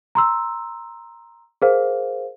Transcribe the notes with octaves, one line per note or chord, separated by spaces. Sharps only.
A#5 C6 E6
G#4 A#4 C5 F5